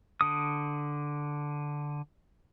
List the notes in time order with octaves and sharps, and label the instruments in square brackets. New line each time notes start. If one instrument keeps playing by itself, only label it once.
[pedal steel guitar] D3 D#6